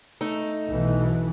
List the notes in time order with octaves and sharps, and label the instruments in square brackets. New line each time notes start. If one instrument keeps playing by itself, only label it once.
[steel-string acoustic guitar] A3 D#4
[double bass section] B1 B2 E3